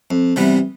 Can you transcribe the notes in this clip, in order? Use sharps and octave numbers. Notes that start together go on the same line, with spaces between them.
F2
C3 E3 G3 B3